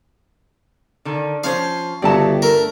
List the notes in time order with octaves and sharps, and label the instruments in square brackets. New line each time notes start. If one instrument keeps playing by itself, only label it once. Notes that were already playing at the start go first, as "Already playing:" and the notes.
[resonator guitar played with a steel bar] D3 D#3
[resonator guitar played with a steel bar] F3 C#4 C5 [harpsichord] F5
[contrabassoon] G1 [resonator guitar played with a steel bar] C#3 F#4 G4 [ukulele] D5 E5 A5
[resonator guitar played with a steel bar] A3 [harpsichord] A#4